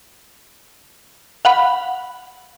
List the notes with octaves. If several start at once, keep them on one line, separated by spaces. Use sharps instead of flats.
F5 F#5 B5